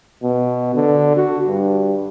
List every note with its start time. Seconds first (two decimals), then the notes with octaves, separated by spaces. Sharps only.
0.23 B2
0.75 D3
1.16 F#4
1.47 G2